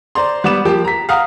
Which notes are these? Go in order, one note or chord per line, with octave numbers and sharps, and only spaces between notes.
C5 D5 A#5 C6
G3 B3 D6 E7
F3 A#3 G4
A#5 B6
F5 F#5 A#5 D#6